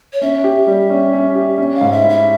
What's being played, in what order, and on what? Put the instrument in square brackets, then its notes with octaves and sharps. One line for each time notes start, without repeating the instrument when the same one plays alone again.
[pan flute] C#5
[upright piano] C#4 [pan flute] E5
[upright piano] G4
G3
C#4
C#4
G4
C#4
[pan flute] F5
[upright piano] G#2
[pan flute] E5
[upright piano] E4
[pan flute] E5